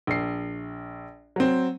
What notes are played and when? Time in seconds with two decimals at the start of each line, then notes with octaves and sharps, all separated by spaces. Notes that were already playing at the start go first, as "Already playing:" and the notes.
0.07 A#1 C7
1.36 F#3 C4